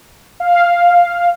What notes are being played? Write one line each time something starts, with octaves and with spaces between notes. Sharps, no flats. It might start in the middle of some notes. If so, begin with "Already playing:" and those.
F5